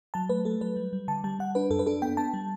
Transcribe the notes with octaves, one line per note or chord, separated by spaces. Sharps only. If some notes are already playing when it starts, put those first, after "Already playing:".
F#3 A5
A3 B4
A3 A4
F#3 B4
G3
G3
D3 A5
G3 A5
G3 F#5
D4 B4
F#2 A4
B4
D4 A4
B3 G5
B3 A5
G3